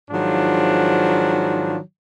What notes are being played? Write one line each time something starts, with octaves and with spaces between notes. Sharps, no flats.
G#2 D#3 F3 F#3 D4 F4